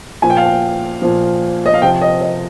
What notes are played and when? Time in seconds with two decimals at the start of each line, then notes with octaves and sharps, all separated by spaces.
0.22 A#2 F3 G#5
0.30 G5
0.37 F5
0.45 G5
1.02 A#2 F3
1.66 D#5
1.74 F5
1.82 C3 F3 G5
2.01 D#5
2.21 D#5